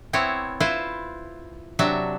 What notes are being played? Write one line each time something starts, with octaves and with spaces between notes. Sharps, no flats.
B3 C4 E4 C#5
E4 F4 B4 C5
C3 F#3 D4 E5